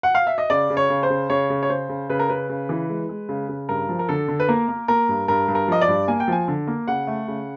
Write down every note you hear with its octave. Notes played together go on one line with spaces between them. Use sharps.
F#5
F5
E5
D#5
C#3 D5
C#3
C#5
C#3
C5
C#3
C#3 C#5
C#3
C#5
C#3 C5
C#3
C#3 B4
A#4
C#3 B4
C#3
E3
G#3
G#3
C#3
C#3
G2 A#4
F3
A#4
D3 A4
D3
B4
A#3 A#4
A#3
A#3 A#4
G2
G2 A#4
G2
A#4
F3 D#5
D5
G2
A#3 G#5
G5
F3 G#5
D3
A#3
C#3 F#5
A3
C#3